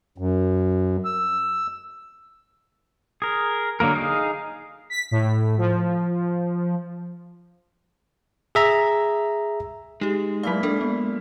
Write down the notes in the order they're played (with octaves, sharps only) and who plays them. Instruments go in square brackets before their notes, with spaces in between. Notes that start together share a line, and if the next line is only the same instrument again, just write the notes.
[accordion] F#2
E6
[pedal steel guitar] G#4 A#4
D3 F#3 A#3 A#4
D#4 G#4 F5
[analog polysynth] B6
A2
F3
[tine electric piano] G#4 E5 A#5
[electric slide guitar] G#3 [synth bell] D#4 G4
[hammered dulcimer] A#2 E4 B5 [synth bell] F#3 F5
[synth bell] D4 A4 A#4
B3